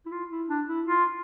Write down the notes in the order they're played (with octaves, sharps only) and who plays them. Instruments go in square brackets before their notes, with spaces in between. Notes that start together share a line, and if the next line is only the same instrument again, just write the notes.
[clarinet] E4
F4
E4
D4
E4
F4